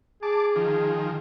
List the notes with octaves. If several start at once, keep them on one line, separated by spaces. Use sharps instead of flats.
G#4 A5 D6
D#3 F3